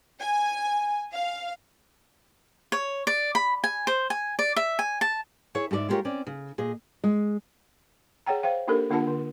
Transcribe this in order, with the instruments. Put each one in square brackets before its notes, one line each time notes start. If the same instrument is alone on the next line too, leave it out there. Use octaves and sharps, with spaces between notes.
[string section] G#5
F5
[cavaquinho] C#5
D5
B5
G#5
C5
G#5
D5
E5
G#5
A5
[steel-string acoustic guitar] E4 G#4 C#5 E5
G#2 F#4 G#4 D5 E5
G#3 E4 F4 G4 A#4 C#5
C4 C#4 D5
C#3
A#2 G#4 D#5
[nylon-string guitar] G#3
[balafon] G#4 C#5 F#5 G5 A#5
C5 F5 G5
A#3 D4 D#4 G4 A4 A#4
D3 A#3 D4 F4 F#5 A5
D3